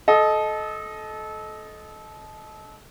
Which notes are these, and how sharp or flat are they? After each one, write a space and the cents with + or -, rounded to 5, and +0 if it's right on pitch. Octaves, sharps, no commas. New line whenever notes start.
A4 -25 D#5 +0